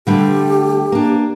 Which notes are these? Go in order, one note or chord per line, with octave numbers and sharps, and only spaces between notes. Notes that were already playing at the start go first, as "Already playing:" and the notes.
D3 G3 A3 G4
A#3 D4